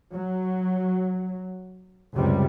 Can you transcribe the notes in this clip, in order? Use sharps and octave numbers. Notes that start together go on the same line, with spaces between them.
F#3
C#2 F#2 C3 G3